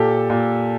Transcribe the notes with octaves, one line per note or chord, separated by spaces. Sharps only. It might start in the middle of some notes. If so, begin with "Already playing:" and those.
Already playing: A#2 G4 A4
A#2